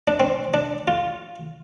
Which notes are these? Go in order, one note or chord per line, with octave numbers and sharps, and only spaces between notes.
D4
C4
D4
F4